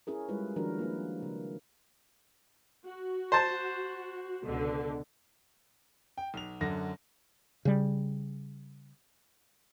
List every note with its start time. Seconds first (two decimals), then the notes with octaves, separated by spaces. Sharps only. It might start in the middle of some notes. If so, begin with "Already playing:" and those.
0.07 C#4 E4 G#4 A#4
0.29 G3 G#3 E4 F4 G#4 B4
0.56 D#3 F3 D4 F#4 A#4
0.79 A#3 E4 B4
1.22 C#3
2.86 F#4
3.32 C5 A5
4.44 C#2 B2 D3
6.18 G5
6.34 B1 F7
6.61 F#2 D3 A#6
7.65 C#3 G3